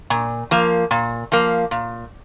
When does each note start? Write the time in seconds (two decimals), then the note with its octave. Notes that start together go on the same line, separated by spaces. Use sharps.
0.10 A#2
0.51 F3 A#3
0.91 A#2
1.32 F3 A#3
1.71 A#2